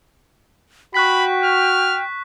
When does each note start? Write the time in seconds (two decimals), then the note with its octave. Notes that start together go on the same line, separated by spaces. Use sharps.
0.94 F#4 G5 B5 C#6 F#6 B6
1.44 F6